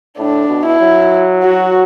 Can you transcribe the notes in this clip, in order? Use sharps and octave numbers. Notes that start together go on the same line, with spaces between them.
A2 D4
B2
E4
F#3
F#4